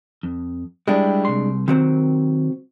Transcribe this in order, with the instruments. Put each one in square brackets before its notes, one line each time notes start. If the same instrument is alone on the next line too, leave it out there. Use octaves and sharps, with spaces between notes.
[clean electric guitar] F2
[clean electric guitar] G3 E4 G4 [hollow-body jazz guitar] G#3 D4
[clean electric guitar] C2 C6
[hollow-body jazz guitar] C3 F#3 C4 [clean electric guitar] D#3